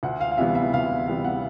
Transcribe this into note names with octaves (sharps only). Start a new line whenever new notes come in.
D2 F#5
F5
F5
C3 E3 G3 B3 E5
E5
D2 F5
C3 E3 G3 B3 F5
F#5